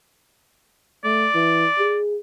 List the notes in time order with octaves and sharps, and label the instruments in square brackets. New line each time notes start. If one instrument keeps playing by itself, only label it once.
[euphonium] A3 [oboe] D5
[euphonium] E3
G#4